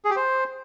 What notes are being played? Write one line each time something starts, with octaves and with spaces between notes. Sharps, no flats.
G#4
G4
C5